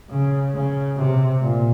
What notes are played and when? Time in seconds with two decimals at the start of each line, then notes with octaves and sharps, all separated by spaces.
0.10 C#3
0.54 C#3
0.97 C3
1.41 A#2